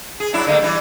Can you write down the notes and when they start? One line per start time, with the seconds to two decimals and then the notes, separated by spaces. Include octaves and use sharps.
0.20 G#4
0.33 F#3 D4 E4
0.47 D3 A3 A#3
0.62 E3 G3